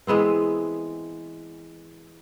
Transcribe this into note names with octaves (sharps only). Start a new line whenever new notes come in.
E3 G#3 B3 C4